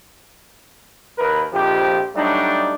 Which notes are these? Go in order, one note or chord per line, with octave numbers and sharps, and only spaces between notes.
D#2 A#4 B4
A#1 F2 F3 G4
F#3 G3 A3 D4 D#4